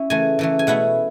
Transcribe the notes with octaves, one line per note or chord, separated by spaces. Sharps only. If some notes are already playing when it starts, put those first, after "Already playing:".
Already playing: C#4 E4
C#3 E3 A3 G#5
C#3 E3 A3
G#5
B2 A3 C#4 E4 F#5